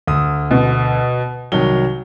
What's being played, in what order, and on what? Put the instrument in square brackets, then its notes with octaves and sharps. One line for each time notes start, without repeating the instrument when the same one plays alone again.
[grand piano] D2 D#6
[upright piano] B2
[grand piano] C2 D#3 F#3 [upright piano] G7